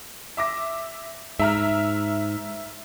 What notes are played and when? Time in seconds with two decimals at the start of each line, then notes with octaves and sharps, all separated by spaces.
0.37 E5 D6 A#6
1.39 G#2 E5 A#5 F6